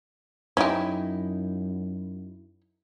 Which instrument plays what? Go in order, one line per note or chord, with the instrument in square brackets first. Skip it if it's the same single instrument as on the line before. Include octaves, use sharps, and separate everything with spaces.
[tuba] F#2 [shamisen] C#4 G4 [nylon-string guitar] D#4 E4